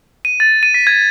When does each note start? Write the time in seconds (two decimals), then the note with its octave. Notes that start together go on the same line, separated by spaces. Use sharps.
0.25 D#7
0.40 A6
0.63 D#7
0.74 B6
0.87 G#6